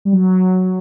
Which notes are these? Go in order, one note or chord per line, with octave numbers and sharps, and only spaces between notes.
G3
F#3